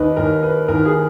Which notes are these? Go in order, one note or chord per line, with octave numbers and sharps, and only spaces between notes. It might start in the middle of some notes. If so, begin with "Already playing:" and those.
Already playing: D#2 D#3 B4 D#5
D#2 D#3 A#4
B4
D#2 D#3 A#4
G#4